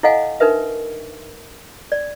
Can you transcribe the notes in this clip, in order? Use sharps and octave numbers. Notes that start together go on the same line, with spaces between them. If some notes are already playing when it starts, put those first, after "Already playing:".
E4 A4 D#5 F5 F#5 G#5
D4 D#4 A#4 B4 E5
D5